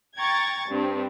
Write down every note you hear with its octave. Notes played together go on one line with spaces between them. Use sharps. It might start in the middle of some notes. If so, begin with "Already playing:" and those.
G5 A#5 C#6 G#6 A6
G2 C4